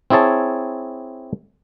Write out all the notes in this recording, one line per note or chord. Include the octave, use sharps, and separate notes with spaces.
C4 E4 G#4 C#5 A5